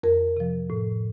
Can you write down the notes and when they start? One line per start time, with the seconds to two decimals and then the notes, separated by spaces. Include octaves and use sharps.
0.03 F2 A#4
0.37 C3 F3
0.70 A2